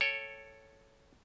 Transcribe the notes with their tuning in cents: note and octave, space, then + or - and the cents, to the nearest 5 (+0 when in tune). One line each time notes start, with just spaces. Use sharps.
A4 +0 C#5 +0 G5 +0